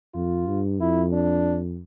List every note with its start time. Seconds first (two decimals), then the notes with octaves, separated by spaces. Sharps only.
0.14 F2 F4
0.48 G2
0.80 F2 E4
1.13 D4